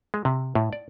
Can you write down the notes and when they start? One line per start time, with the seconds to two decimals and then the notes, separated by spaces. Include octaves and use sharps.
0.14 G#3
0.25 C3
0.55 A2
0.73 D5